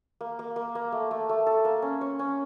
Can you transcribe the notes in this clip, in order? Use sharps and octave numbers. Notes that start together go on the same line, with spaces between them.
A#3
A#3
A#3
A#3
A3
A3
A3
A4
A#3
C#4
C#5
C#4